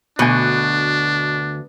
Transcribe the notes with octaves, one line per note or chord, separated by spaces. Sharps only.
D2 B2 D4 G#5